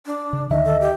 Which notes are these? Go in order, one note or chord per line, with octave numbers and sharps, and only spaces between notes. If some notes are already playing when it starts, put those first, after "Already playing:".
D4
C#3
D2 D3 D#3 D#5 E5
A4
G4